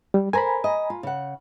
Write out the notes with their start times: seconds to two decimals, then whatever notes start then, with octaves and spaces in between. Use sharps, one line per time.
0.14 G3
0.33 A#4 C5 G#5 A#5 B5
0.64 D#5
0.90 F4
1.03 C#3 F#5